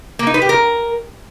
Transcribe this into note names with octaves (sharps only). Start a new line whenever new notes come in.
A#3
D#4
B4
G4
A#4